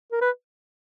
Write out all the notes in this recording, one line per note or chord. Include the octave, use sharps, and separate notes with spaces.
A#4
B4